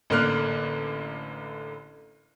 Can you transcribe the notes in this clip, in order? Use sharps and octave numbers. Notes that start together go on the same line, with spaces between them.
A1 D3 A#3 F6 F#6